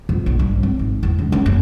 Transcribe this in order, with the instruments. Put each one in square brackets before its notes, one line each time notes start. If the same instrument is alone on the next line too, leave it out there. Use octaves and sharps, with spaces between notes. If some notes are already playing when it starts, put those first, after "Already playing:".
[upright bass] F2
A#1
G2
C4
G#1
E2
C#2
C#4
F#1